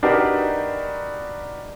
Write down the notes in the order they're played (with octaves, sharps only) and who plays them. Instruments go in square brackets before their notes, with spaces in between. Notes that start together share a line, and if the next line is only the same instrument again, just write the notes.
[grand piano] D4 D#4 F#4 G4 A#4 B4